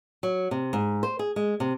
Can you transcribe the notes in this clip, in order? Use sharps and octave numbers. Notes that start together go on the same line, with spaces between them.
F#3
C3
G#2
C5
G#4
G#3
C3